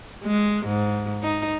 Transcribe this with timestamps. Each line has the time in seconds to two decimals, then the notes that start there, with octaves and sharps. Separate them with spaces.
0.25 G#3
0.66 G#2
1.24 D#4